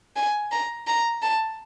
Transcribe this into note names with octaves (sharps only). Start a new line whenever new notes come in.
G#5
A#5
A#5
A5